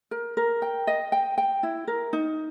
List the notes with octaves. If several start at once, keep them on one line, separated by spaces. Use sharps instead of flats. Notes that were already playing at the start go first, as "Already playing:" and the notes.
A#4
A#4
G5
D#5
G5
G5
E4
A#4
D#4